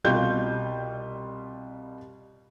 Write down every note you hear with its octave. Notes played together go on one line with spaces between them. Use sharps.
C2 B2 G3 F4 G6